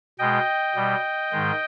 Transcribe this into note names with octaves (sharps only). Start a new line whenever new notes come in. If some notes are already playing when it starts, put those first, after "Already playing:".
B2 G#3 D#5 G5
B2 G3
G#2 D#3 G#3